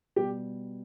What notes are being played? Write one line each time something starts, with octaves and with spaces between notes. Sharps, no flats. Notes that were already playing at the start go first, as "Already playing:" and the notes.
B2 G3 G4